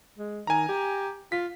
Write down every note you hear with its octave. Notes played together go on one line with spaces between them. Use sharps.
G#3
D#3 G#5 A#5
G4
F4 B6